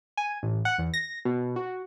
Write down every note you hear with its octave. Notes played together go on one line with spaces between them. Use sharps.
G#5
A1
F#5
E2
A#6
B2
F#4